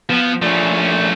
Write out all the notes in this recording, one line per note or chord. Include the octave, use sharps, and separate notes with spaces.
F3 B3
F3 A3 C#4 D4